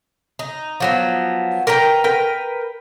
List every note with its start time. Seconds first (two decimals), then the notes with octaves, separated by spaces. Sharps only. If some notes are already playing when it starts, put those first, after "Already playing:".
0.39 D#4
0.80 F3 F#3 B3
1.67 A#4 B4 G5 A#5
2.04 A#4 B4 G5